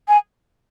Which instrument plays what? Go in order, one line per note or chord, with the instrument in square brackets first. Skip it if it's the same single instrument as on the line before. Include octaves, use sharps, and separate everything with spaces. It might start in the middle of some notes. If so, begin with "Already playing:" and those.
[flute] G#5